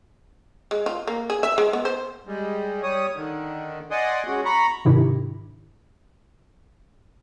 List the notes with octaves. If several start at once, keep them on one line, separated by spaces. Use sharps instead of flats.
G#3
F4
A#3
G#4
E5
G#3
B3
C5
G3 G#3
G3 C#5 D#6
D3 D#3
D5 D#5 F#5 G#5 C6 D#6
G#3 C#4 F#4
A#5 B5 C#6
G#2 C3 D#3 D4 E4 G4